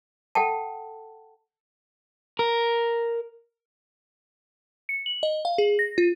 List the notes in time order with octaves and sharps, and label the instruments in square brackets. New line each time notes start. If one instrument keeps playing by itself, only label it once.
[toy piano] A4 F#5 G5 A5
[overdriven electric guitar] A#4
[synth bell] C#7
F#7
D#5
F5
G#4
A#6
F4